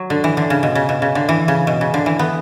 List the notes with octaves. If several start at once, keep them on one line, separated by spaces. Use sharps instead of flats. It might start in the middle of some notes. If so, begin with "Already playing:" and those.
Already playing: F#3
D3
E3
D3
C#3
B2
C#3
B2
C#3
D3
E3
C#3
B2
C#3
D3
E3
B3